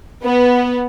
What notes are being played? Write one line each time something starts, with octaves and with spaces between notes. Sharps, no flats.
B3